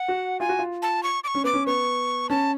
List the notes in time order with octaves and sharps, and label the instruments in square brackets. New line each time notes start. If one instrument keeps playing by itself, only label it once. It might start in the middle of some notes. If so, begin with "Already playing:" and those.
Already playing: [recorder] F#5
[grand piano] F#4
[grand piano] F4 [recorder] G#5
[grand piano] F#4
F4
[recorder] A5
C#6
D6
C#6
[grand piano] C#4
[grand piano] B3 [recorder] D6
[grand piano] C#4
[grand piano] B3 [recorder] C#6
[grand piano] C#4 [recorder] A5